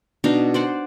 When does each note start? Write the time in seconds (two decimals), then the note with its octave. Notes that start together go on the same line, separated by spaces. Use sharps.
0.24 B2 D4 D#4 F5
0.54 C5 D5 F#5